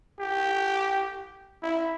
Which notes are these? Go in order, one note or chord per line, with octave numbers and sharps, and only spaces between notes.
G4
E4